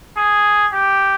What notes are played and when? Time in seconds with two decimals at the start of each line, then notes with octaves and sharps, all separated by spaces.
0.17 G#4
0.73 G4